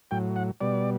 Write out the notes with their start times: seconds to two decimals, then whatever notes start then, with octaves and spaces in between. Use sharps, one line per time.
0.11 A2 F#3 G5
0.36 F#5
0.61 B2 G3 D5